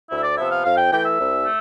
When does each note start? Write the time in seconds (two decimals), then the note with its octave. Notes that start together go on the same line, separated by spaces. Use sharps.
0.09 D2 E4
0.17 E5
0.24 D5
0.37 C3 F3 B3 E5
0.51 F5
0.64 F2 F5
0.78 G5
0.92 E3 A3 G5
1.05 E5
1.19 C2
1.45 A3